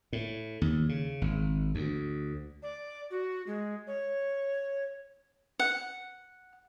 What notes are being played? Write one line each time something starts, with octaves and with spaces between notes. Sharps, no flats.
A2
D#2
C#3
G#1
D2
D5
F#4
G#3
C#5
F#5